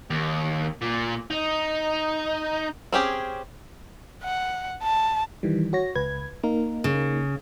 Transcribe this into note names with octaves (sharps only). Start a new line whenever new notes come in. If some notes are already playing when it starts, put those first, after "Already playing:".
D#2
A#2
D#4
C4 C#4 G4 G#4
F#5
A5
D#3 E3 G3
F#4 C#5 A#6
C#2 B4 G#6
A#3 D#4 A#4
C#3